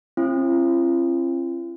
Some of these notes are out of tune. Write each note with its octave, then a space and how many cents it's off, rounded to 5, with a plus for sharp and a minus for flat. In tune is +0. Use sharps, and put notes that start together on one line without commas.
C4 +40 F4 -45